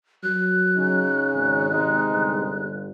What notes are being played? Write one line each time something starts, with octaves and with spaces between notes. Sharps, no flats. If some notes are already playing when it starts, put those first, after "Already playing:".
F#3 F#6
C#3 C#4 D#4
G#1
C3 G#3 D#4
G1